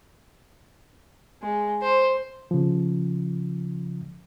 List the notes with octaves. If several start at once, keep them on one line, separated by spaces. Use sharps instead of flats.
G#3
C5
C#3 F3